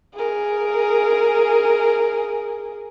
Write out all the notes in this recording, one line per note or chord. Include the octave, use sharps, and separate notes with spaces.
G#4 A#4